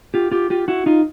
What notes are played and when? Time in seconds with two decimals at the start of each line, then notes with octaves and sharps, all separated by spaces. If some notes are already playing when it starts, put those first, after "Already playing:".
0.14 F4 G4
0.31 F4 G4
0.50 F4 G4
0.68 E4 F#4
0.86 D#4 F4